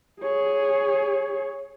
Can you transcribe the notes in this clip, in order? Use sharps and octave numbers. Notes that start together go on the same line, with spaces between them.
G#4 C#5